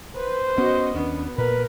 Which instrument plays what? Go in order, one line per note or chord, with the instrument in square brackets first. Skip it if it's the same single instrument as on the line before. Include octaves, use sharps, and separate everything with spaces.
[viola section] B4 [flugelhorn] C5
[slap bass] B3 C#4 [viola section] F#4 D#5
[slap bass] D#2 C#4 D4 [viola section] B3
[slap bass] A#2 [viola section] A#4 [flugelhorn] B4